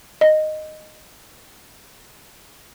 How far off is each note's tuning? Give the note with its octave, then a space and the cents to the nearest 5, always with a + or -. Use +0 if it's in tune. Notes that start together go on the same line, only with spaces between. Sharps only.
D#5 -10